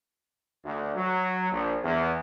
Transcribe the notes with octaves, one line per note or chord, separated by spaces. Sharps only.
D2
F#3
A#1
E2